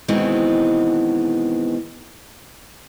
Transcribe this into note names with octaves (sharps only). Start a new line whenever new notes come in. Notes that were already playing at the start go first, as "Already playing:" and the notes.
B2 D#3 E3 G#3 B3 C4